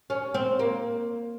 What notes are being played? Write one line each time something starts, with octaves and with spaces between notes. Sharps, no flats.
C#4
C4
A#3